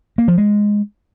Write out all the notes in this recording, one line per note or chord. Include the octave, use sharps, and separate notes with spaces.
A#3
F3
G#3